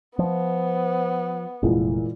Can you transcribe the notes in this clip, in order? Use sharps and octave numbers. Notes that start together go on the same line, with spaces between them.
F3 B3
F1 A#2 E3 G#3